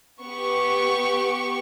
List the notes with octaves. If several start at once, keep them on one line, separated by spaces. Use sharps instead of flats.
B3 G4 C#6